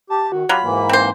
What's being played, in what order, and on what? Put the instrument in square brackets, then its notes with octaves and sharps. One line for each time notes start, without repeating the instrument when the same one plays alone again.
[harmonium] G4 [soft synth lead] A5
[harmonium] D#3 [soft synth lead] F#4
[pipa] F#3 F4 [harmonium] G4 [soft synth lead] B5
[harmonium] G#2 E3 A#3
[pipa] C4 C5